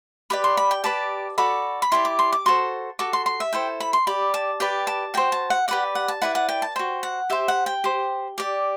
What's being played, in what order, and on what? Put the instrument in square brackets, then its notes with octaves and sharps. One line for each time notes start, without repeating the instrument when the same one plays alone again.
[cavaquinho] G4 B4 D5 B5
C6
B5
G5
G4 B4 D5 A5
F#4 A4 D5 B5
B5
E4 G4 D5 C6
D6
C6
D6
F#4 A4 C5 C6
F#4 A4 D6
C6
C6
E5
E4 A4 C5 G5
B5
C6
G4 D5 B5
A5
G4 B4 D5 G5
A5
F#4 C5 G5
A5
F#5
G4 B4 D5 F#5
F#5
A5
E4 B4 D5 F#5
F#5
G5
A5
F#4 C5 G5
F#5
G4 C5 E5
F#5
G5
G4 C5
G4 D5